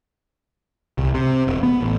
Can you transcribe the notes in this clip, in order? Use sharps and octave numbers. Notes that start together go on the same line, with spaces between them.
C2
C3
E1
B3
A1